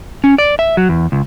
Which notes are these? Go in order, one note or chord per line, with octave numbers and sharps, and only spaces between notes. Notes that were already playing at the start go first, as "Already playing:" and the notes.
C#4
D5
E5
F#3
E2
C#2